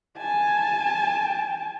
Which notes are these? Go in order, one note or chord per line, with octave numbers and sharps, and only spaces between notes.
G#5 A5